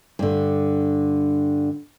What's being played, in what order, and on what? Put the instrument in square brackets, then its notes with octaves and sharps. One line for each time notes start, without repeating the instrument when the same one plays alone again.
[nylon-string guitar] G2 D3